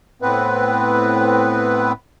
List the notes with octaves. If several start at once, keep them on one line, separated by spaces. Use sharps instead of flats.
A2 B3 C4 B4